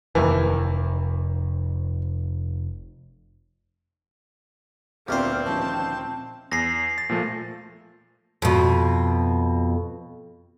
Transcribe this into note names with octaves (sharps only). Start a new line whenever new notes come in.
F1 D#2 E3
D2 A#2 B3 C4 D4 G4 C5 F6
D#3 F3 C#4 A5
E2 A#6 C7
A6
A#2 F3 A3
F2 B2